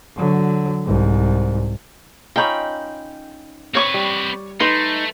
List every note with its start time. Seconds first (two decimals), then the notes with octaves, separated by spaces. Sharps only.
0.16 D3 F#3
0.84 C2 G#2
2.36 C#4 D#4 F4 G5 B5
3.75 C4 B4 C#5 C#6 D6
3.94 G3
4.60 A3 D#4 B4 C6